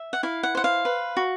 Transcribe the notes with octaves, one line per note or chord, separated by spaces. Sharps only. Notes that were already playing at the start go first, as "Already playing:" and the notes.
Already playing: E5
F#5
E4 F5
F#5
C5 F#5
F5
B4
F#4